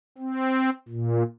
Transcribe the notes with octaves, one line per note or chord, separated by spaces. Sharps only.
C4
A#2